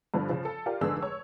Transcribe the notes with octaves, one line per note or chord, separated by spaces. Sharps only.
G2 D3 F3
C#3 F3
A4
F4 G4 A#4 D5
F1 G#2 D3 G#4 B4 E6
C#5